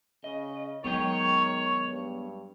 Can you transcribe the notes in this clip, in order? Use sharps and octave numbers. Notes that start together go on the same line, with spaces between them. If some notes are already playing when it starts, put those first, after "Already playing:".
C#3 D#5
D#3 F#3 G#3 B3 G#4 C#5 G5
G2